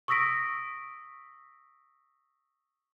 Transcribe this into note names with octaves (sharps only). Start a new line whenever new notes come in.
C#6 D#6 E6 A#6 B6 D7